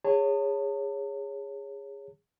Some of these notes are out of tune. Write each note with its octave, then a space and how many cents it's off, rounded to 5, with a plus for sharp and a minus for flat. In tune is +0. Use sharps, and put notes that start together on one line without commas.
G#4 -20 C#5 +0 A5 +40